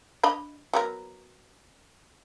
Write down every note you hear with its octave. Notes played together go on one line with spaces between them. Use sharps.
D4 D#5 B5
F#3 B3 A#4